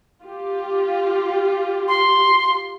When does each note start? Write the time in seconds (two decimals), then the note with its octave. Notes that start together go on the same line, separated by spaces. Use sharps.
0.23 F4 G4
1.88 C6